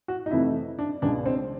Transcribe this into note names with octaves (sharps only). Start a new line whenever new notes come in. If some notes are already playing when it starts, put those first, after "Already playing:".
F#4
D#4
F2 C3 E3 A3 E4
D4
C#2 B2 G#3 D4
C4